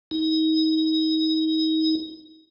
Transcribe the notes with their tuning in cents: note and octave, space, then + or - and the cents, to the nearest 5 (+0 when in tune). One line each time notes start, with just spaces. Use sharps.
D#4 +30